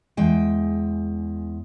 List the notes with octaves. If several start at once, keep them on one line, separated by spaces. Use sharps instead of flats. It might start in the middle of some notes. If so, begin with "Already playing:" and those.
E2 G#3 G5